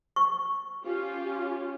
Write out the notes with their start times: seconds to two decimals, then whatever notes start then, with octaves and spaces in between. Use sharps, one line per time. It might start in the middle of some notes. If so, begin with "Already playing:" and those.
0.16 C#6
0.83 C#4 F4 G4